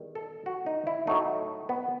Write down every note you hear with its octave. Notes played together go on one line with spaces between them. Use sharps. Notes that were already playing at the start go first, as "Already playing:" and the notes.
Already playing: E2 D#3 G3
A4
F#4
D#4
E4
A2 F#3 A3 D#4
B3